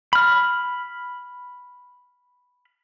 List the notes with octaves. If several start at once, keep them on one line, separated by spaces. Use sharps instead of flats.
B5 F6